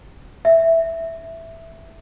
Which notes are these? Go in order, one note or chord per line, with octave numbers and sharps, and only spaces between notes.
E5